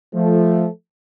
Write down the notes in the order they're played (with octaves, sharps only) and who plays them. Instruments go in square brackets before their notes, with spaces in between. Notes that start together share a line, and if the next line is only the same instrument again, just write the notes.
[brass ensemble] F3 A3